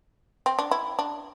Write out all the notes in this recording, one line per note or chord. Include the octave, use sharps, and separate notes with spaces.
C4
D4
E4
D4